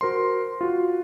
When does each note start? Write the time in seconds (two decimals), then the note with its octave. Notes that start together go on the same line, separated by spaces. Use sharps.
0.01 F#4 A#4 C5 C6
0.61 F4 F#4